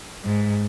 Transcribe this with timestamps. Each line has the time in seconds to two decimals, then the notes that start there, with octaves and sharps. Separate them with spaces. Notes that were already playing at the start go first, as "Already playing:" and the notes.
0.25 G#2